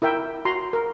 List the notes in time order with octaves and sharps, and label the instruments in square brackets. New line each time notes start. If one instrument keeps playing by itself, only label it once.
[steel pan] E4 A#4 E5 G5
F#4 A#5 C6
A#4